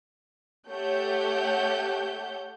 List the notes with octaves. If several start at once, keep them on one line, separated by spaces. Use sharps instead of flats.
A3 G4 C#5 F#5 G6